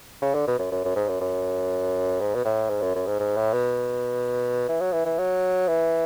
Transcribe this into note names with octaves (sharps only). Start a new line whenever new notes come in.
C#3
D3
B2
F#2
F#2
F#2
G#2
F#2
F#2
G#2
B2
A2
G#2
F#2
F#2
G#2
G#2
A2
B2
E3
F#3
E3
E3
F#3
E3